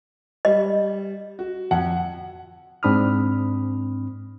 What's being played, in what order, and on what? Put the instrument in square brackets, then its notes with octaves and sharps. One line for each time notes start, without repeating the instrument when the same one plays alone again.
[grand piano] G3 [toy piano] D#5
[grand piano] F#4
[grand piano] F2 [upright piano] F#5
[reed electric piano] G#2 C4 D4 B5 D#6 F6